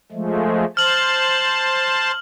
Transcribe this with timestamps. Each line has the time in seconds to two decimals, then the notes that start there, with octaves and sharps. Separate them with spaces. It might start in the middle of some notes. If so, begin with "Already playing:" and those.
0.12 F3 G#3 A3
0.77 C5 A5 F6 F#7